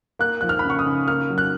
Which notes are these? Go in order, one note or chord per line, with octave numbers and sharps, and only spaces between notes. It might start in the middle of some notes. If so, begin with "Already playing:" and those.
A#3 F#6
F3 F#6
F6
B5
C#3
C#6
D#6
C#3
A#3 F6
F#3
F#6